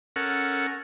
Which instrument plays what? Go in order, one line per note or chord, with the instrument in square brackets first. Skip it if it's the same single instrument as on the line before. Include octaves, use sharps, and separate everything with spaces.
[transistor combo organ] C#4 A4 A#4 F#5